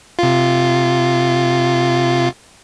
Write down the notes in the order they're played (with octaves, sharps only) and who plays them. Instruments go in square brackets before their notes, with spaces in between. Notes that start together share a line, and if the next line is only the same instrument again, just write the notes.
[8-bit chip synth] C3 F4